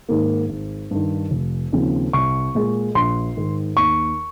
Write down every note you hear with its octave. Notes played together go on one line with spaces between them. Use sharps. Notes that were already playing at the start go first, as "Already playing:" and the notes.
G#2 D#3 A#3
G#1
G2 D#3
F1
D#2 C#3 F3 C4
C2 C#6
A#2 G#3
A#1 C6
G#2 D#3
D#2 C#6